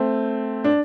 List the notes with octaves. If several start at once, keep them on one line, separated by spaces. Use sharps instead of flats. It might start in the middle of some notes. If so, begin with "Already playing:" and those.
Already playing: A3 C4
D4